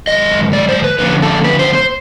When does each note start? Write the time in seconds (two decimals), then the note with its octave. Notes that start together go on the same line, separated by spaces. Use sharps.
0.07 F#2 D#3 G#3 D#5
0.53 D5
0.69 C5
0.84 B4
0.99 D3 F3 A#3 C#4 B4
1.22 A4
1.44 B4
1.59 C5
1.75 C5